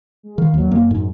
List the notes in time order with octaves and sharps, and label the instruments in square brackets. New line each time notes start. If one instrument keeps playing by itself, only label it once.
[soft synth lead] G#3
[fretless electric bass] D#3 [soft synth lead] F5
[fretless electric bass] D#2 [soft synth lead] F#3
[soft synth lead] F#2 [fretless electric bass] A#3
[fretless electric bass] G#2